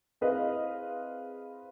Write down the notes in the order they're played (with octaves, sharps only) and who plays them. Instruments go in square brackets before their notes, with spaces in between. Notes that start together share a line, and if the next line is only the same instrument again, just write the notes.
[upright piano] C4 E4 G#4 B4 D#5 F5